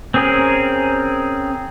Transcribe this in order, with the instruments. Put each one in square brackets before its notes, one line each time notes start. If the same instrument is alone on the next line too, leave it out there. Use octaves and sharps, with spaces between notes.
[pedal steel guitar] C4 C#4 G#4 A#4